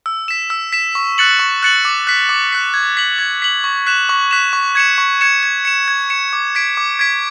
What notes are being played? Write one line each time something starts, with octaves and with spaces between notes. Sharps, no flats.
E6
B6 E7
E6
B6 E7
C#6
F#6 A6 C#7 F#7
C#6
F#6 A6 C#7 F#7
D6
F#6 B6
D6
F#6 B6
G#6
B6 F#7
G#6
B6 F#7
C#6
F#6 B6 E7
C#6
F#6 B6 E7
C#6
G#6 C#7 E7
C#6
G#6 C#7 E7
G#6
C#7 E7
G#6
C#7 E7
D6
G#6 B6 D7
D6
G#6 B6 D7